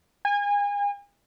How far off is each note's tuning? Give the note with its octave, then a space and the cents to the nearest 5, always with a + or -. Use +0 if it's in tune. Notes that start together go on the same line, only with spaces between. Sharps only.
G#5 -35